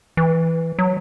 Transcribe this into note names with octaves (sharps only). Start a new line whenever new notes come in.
E3
F#3